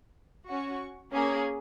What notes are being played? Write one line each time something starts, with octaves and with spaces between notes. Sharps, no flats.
C#4 F#4 C#6
A#3 C#4 G#4